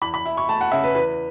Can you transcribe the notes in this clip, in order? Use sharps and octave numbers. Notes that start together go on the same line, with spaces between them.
E2 B5
B5
E4
C#6
A3 A5
F#5
C#3 E5
B4
E2 B4